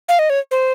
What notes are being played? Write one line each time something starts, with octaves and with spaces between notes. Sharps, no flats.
F5
D#5
C#5
C5